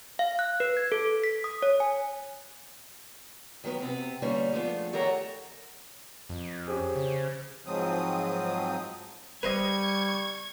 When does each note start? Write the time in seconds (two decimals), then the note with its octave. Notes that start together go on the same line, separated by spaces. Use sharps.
0.19 F5
0.39 F#6
0.60 B4
0.77 G#6
0.92 A4
1.24 B6
1.44 D#6
1.63 C#5
1.80 G#5
3.64 D#3 F#3 B3 B4
3.82 C3 B3 C4
4.22 D3 G3 A#3 C#4 D#4 B4
4.52 F3 G#3 A3 B3 D4
4.93 D#3 G4 A4 A#4 C#5 F#5
6.29 F2
6.68 C#4 G4 G#4 C5
6.96 C#3
7.66 G#2 F3 F#3 C4 D#6
9.43 G3 B4 C5 D#5 C#6 G#6